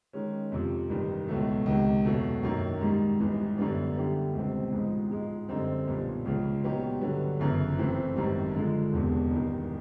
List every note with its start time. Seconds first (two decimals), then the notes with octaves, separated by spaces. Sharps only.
0.13 D#3 G#3 C#4
0.52 F2 C3 F3
0.90 A1 G2 D#3
1.28 C#2 B2 F#3 A3
1.66 C#2 C3 D#3
2.05 E2 B2 F#3 A3
2.43 F#2 D#3 F#3 A#3
2.81 G#2 D#3 G3
3.19 A1 G#2 E3 G3
3.57 F#2 D3 G3 B3 D4
3.96 D3 G3 B3 E4 G4
4.33 C#2 B2 G3 C4
4.72 A1 G#2 F3 G#3
5.11 G#2 F3 G#3
5.49 F#2 D3 G3 C4 D#4
5.87 B1 A#2 G3 B3
6.25 C#2 C#3 F3
6.63 A#2 F#3 B3 D#4 G4
7.01 G2 D3 F#3 B3
7.39 G1 F#2 C#3 E3
7.78 A2 E3 A3 C4
8.16 G#1 F#2 D#3 G3
8.55 D3 F3 G#3
8.93 E1 E2 C3
9.31 A1 G2 D#3